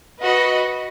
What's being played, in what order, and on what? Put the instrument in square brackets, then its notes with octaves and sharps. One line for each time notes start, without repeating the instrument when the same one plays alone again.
[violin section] F#4 B4 D#5